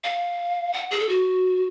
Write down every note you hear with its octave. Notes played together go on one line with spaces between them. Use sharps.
F5
F#5
G#4
A4
F#4